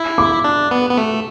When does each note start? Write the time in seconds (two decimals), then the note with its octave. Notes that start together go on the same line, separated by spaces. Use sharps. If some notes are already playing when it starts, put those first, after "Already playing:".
Already playing: E4
0.18 D6
0.44 D4
0.71 B3
0.89 B3
0.97 A3